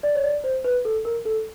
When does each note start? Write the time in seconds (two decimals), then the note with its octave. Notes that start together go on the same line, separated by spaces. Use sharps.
0.03 D5
0.15 C#5
0.24 D5
0.44 C5
0.64 B4
0.85 A4
1.05 A#4
1.25 A4